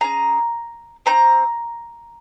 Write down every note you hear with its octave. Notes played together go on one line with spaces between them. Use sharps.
C#4 G#4 A#5
C4 D#4 A#5